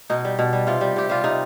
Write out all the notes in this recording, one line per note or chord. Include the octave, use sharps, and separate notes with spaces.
B2 D#4
G3
B2
G3
C3 F4
G3
C3 G4
G3 F4
C3 D#4